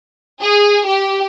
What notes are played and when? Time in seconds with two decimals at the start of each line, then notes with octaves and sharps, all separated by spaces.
0.41 G#4
0.87 G4